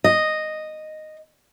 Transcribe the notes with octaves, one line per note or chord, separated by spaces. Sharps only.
D#5